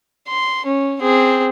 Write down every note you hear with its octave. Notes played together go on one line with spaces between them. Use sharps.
C6
C#4
C4 G#4